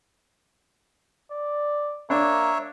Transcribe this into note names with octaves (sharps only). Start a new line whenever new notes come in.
D5
A#3 D4 C#5 E5